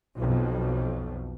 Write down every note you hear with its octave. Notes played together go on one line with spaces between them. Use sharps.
B1 F2